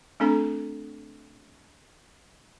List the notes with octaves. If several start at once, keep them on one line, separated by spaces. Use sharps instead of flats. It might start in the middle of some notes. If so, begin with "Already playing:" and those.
A3 C4 D4 A4 A#5